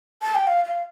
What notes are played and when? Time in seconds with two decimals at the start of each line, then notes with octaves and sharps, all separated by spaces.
0.22 A5
0.35 G5
0.47 F5
0.65 F5